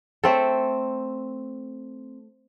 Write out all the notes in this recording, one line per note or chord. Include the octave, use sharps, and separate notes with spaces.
A3 C4 A4